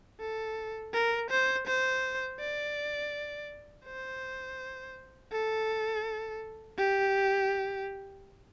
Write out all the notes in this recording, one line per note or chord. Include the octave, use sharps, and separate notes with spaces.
A4
A#4
C5
C5
D5
C5
A4
G4